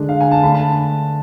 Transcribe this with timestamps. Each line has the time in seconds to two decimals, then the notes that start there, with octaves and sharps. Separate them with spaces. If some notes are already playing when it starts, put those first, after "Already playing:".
Already playing: D3 G#3 D4
0.09 F5
0.21 G#5
0.31 A5
0.43 D3 A3 D4 B5
0.54 A5